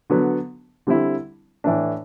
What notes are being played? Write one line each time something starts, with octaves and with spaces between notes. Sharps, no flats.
D3 F#3 B3
D3 G3 C4 E4
A2 E3 A3 D4